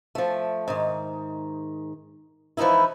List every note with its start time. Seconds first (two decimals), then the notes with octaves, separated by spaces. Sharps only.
0.15 F3 A3
0.68 G#2 D#3
2.57 E3 F3 G#3 D#4 E4